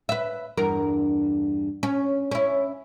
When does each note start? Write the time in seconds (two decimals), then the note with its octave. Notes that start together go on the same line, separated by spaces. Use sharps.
0.09 B4 E5
0.57 E2 G2 A#4
1.83 C#4
2.31 C#4 E4